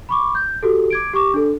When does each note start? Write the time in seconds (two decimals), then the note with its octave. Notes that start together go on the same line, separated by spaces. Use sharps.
0.09 B5 C#6 D6
0.35 G6
0.63 F#4 G4 A4
0.90 D6 G#6 D7
1.14 G4 C#6 D6
1.34 D4 A4